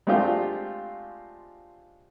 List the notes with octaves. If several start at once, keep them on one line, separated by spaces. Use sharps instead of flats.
G#3 A3 C4 D4 F4 G4